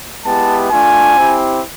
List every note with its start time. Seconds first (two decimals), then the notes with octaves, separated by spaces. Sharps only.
0.24 G#3 B3 E4 G4 A5
0.69 A3 D4 F4 G#5
1.16 C4 E4 G4